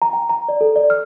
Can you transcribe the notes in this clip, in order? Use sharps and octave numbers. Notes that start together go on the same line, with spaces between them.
A#5
G5
A#5
D5
A4
D5
F6